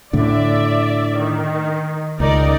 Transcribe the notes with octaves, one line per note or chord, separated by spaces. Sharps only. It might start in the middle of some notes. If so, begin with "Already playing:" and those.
A2 D3 D5 E5
D#3
C#2 D#4 A#4 D5